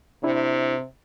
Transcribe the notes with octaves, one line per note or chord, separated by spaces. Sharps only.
C3 D4 E4